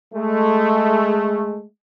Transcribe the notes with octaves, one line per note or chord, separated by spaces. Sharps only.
G#3 A3